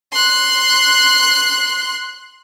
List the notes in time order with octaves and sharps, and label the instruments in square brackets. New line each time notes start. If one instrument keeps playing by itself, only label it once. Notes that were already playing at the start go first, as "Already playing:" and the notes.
[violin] C6 F#6